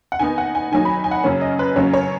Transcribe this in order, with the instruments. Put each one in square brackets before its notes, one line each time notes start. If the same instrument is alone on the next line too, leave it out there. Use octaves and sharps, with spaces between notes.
[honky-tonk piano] F#5
D#3 B3 D#4 G#5
F#5
G#5
D#3 F#3 D#4 G#5
B5
G#5
F#5
F#2 C#3 F#3 C#4
D#5
B4
F#2 C#3 F#3 C#4 C#5
C#5